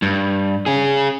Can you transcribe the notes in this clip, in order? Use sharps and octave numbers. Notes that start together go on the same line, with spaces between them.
G2
C#4 G#4